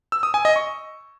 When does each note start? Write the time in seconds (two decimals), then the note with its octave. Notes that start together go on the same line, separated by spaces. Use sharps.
0.12 E6
0.23 D#6
0.34 G#5
0.45 D#5
0.56 C#6